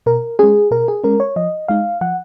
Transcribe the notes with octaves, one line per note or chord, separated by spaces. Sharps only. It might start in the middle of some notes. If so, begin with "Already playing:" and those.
B2 A#4
G#3 C#4 G#4
B2 A#4
G#4
G#3 C#4 A#4
C#5
F3 D#5
G#3 D#4 F5
F3 F#5